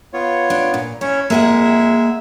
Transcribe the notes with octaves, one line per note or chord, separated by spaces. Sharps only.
B3 F4 C#5
D4
A#2
C#4 E4 C#5
F2 G#3 A#3 G#4 E5 F#5